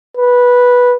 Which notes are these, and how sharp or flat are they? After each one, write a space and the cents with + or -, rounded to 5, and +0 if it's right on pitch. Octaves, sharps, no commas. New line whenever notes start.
B4 -10